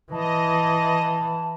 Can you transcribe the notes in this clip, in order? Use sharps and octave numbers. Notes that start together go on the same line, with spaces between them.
E3 D#5 A5